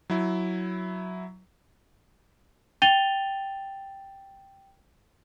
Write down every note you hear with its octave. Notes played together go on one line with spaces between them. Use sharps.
F#3 E4
G5 A6 D#7 F7 G7